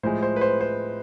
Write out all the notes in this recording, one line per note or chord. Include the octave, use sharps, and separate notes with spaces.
A2 F3 G#3 C5
C5
B4
C5
C5